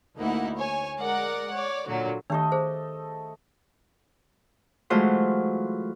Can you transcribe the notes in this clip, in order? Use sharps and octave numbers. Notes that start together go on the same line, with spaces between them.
D2 A#3 D#4 E4 F#5
C#5 G#5
G#3 A#4 D5 F#5
C#5 D5
A#2 D3 F#3 F#4
D#3 A3 D4 G4 A4 D#5
G#4 C5
E3 F#3 G#3 A3 F4 C5